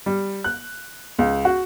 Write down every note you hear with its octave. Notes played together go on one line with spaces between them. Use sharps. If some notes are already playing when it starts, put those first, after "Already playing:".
G3
F#6
C#2
F#4